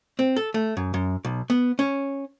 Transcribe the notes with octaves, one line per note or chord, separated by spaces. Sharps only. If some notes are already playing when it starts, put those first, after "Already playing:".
C4
A4
A3
F#2
F#2
B1
B3
C#4